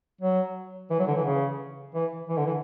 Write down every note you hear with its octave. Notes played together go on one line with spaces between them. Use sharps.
F#3
E3
F#3
D3
E3
C#3
E3
E3
D3
E3